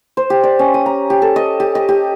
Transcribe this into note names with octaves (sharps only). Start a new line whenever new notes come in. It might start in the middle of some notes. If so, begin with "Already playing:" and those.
C5
G4
D5
C#4
D#6
A#5
G4
A4
D#5
G4
D#5
G4